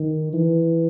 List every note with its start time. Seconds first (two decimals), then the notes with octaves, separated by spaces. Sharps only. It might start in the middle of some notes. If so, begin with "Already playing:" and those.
Already playing: D#3
0.33 E3